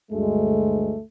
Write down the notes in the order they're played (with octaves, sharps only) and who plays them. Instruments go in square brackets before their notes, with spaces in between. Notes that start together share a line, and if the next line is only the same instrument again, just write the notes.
[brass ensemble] D2 G2 G#3 [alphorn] A3